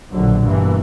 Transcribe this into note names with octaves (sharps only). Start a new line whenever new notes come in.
A#1 B2 D3 F#3
G1 G2 B2 E3 A#3